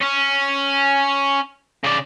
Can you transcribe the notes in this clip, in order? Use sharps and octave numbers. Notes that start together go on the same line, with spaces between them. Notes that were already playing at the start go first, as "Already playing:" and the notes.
C#4
C#3 D5